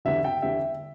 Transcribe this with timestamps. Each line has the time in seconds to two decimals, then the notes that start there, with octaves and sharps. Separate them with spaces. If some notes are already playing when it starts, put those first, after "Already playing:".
0.05 E2 D3 G3 E5
0.24 G5
0.42 E2 D3 G3 E5